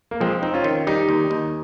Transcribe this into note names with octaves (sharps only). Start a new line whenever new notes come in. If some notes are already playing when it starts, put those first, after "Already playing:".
A#3
F3 G#3 C4
C4 D#4
C#4 F4
D#3
G3 D#4 G4
D#2
D#2